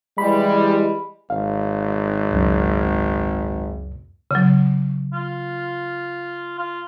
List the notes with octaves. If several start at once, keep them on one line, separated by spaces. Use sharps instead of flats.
E3 G3 G#3 B5
G#1 F5
C#2 F#2
C#3 F#3
F4
F4